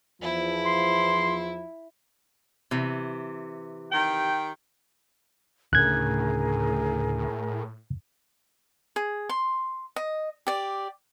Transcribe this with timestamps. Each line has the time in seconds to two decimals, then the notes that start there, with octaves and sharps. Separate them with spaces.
0.22 E2 F3 E4
0.66 C6
2.71 C3 E3
3.92 D#3 G4 G5
5.73 D2 A2 C#3 G#4 A#4 G#5 F#6 G#6
8.96 G#4
9.29 C6
9.96 D#5
10.47 G4 D5